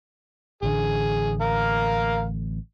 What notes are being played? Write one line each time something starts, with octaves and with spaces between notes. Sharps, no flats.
A1 D3 G#4
A#4 F5